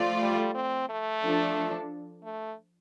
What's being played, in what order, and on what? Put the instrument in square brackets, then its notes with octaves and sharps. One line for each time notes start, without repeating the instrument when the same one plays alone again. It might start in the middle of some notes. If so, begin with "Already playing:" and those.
Already playing: [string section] F3 A3 F4 D5
[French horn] G3
C4
A3
[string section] F3 D4 A4
[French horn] A3